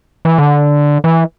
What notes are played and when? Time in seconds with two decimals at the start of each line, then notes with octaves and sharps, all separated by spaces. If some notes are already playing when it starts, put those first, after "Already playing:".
0.25 E3
0.38 D3
1.04 E3